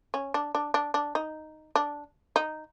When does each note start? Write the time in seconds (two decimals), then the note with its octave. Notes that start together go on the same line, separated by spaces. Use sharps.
0.14 C#4
0.34 D4
0.55 D4
0.74 D4
0.94 D4
1.15 D#4
1.75 D4
2.36 D#4